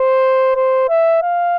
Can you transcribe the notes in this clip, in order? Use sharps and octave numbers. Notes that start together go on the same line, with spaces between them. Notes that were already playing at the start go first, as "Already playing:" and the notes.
Already playing: C5
C5
E5
F5